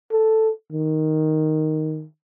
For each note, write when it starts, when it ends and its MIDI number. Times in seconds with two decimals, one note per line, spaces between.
0.12 0.50 69
0.72 2.04 51